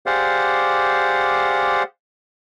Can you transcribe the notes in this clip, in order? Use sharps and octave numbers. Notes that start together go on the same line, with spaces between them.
G4 G#4 C5 D5 F5 F#5